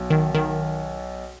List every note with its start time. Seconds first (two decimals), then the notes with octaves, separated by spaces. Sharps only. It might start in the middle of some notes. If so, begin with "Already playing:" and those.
Already playing: B1
0.10 D#3
0.35 D#3